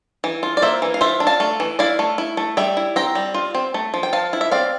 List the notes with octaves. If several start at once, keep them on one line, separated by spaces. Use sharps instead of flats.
E3
F4
D5
A#3 C5 E5
E3
F5
F4 C5 E5
D4
F5 A5
A3
E3
E4 D5 F5
A3
E4
A3
G3 E5 G5
E4
C4 G5 A#5
G3
F4
C4
A3
F3
G5
F3 F5 A5
E4
E5
C4 D5 F5